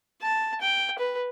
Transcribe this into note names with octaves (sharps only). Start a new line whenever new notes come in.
A5
G5
B4